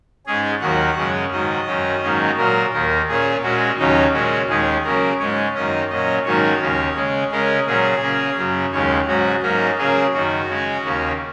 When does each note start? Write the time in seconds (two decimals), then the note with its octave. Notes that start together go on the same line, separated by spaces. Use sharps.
0.26 G#2 G#3 C#4 G#4
0.61 D#2 D#3 F#3 A#3 F#5
0.97 F#2 C#3 G#3 C#4
1.31 G#2 D#3 F#3 D#5
1.67 F#2 D#3 F#3 C#4
2.03 G#2 D#3 F#3 A#3 C#4
2.37 A#2 F#3 A#3 A#4
2.73 D#2 D#3 A#3 A#4
3.08 A#2 A#3 C#4 G#4
3.43 A#2 G#3 C#4 F#4
3.78 D#2 C#3 F#3 C#4 D#4
4.13 A#2 G#3 C#4 F#4
4.49 D#2 D#3 G#3 C#4 G#4
4.84 C#3 F#3 A#3 C#4 A#4
5.19 G#2 G#3 C#4 C#5
5.55 F#2 D#3 A#3 C#4 D#5
5.90 A#2 F#3 C#4 D#5
6.25 G#2 D#3 F#3 A#3 C#4 C#5
6.61 D#2 C#3 A#3
6.96 C#3 G#3 C#4
7.31 C#3 G#3 C#4 A#4
7.66 A#2 F#3 C#4 G#4
8.02 C#3 A#3 C#4
8.38 F#2 C#3 F#3
8.72 D#2 C#3 G#3 C#5
9.08 G#2 F#3 C#4 F#4
9.42 G#2 F#3 A#3 C#4 A#4
9.78 C#3 F#3 A#3 C#4 G#4
10.14 F#2 D#3 F#3 F#4
10.49 C#3 G#3 C#4
10.84 D#2 C#3 A#3 C#4